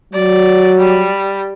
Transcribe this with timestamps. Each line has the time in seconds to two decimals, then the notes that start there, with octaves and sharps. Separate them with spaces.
0.13 F#3 D5
0.78 G3